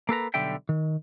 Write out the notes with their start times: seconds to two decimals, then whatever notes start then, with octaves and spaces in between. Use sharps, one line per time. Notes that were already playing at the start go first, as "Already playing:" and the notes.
0.09 A#3 A4 B4 A#5
0.34 B1 D3 G3 E5 G5
0.69 D#3